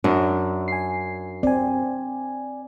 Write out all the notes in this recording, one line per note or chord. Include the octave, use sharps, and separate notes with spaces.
F#2 D4
G#5 C7
C4 D5 G#5